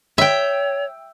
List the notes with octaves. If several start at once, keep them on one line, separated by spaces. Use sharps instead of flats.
C#5 E5 G5